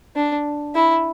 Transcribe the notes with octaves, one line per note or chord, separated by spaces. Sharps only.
D4
E4